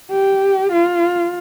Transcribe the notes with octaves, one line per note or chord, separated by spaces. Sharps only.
G4
F4